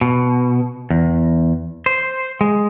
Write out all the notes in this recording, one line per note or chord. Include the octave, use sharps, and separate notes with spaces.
B2
E2
C5
G#3